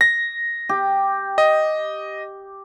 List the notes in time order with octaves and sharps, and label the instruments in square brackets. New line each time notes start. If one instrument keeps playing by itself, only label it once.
[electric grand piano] A#6
[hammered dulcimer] G4
[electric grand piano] D#5